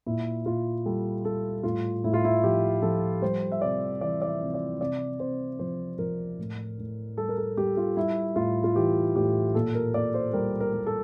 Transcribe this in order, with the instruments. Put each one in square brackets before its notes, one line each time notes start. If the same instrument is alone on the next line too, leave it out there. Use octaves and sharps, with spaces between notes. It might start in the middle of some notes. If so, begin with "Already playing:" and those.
[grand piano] A#2 E4
A#2 F4
G3 A4
G3 A4
A2 F4
A2 E4
F4
E4
F3 G4
F3 A4
G3 C5
E5
C3 D5
E3 D5
D5
E5
C3
D5
C3 D5
C3 C5
F3 C5
F3 A#4
A2
A2
G3 A4
A#4
A4
G3 G4
F4
G3 E4
A2 F4
F4
E3 G4
A2 G4
A#2 A4
A#4
A#2 D5
C5
G3 A#4
A#4
G3
A4